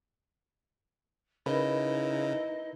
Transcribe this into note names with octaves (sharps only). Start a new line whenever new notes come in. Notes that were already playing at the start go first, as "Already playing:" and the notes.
C#3 D#4 E4 A#4 B4 D#5 B5